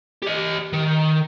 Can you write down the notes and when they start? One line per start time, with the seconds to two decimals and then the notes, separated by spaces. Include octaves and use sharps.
0.23 G4 D#5
0.73 D#3